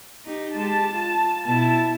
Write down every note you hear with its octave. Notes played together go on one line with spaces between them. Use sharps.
D#4 G4
G#3 G4 A5
F4
B2 E4 A5